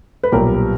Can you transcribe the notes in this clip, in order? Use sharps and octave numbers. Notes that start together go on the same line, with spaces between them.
B4
B1 A#2 G3 B3 G4 A#4